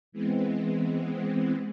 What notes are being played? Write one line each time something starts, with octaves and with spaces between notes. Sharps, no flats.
E3 G#3 B3 C4